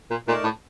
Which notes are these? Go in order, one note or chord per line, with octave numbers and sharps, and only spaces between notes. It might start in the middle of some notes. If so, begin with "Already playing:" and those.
A#2
A#2 A3 D#4 A#4 D5 A5
A2